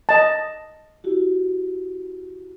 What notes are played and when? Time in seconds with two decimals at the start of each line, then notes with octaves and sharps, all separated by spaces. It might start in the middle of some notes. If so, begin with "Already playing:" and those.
0.09 D#5 A5
1.04 E4 F#4 G4